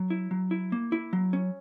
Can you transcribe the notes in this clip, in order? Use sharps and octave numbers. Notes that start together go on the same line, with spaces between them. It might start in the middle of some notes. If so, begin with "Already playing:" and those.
Already playing: F#3
E4
F#3
E4
A#3
E4
F#3
C#4